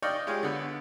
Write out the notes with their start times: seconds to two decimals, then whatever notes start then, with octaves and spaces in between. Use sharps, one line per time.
0.02 D5 D#5 F5 G5 C#6
0.27 G#3 F4 G4 G#4 C#5
0.43 D3 B3